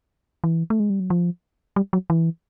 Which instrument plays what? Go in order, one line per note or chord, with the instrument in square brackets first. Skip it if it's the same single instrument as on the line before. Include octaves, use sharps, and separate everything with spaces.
[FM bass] E3
A3
G#3
G3
F#3
F3
G3
F#3
E3